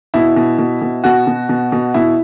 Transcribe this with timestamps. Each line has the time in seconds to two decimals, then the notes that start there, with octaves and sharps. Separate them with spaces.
0.14 B2 E4
0.36 B2
0.58 B2
0.81 B2
1.04 B2 F#4
1.27 B2
1.49 B2
1.72 B2
1.94 B2 E4